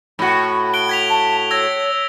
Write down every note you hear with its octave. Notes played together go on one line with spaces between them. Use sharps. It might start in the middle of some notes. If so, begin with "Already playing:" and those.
A2 F#4 B5
F#6 D7 G7
G#6 B6 F7
A5
C#5 E6 G#6 A#6